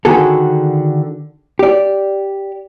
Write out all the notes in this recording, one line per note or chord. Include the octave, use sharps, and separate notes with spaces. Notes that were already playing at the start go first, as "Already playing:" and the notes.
D3 D#3 F#4 G#4 A4
G4 D5